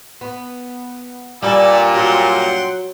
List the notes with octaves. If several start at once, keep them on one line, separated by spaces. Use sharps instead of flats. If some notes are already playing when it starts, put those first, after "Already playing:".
B3
G2 A#2 G3 A4 D5 G#5
F#3 F#5 G5 C6